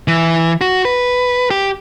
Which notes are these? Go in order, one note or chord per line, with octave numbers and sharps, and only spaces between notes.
E3
F#4
B4
G4